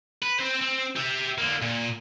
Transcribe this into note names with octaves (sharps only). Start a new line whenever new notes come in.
B4
C4 C5
C4
G4 E5
D3 A#3
A#2